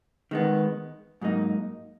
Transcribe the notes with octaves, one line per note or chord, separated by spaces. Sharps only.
D#3 G#3 B3
G#2 F#3 A#3 D#4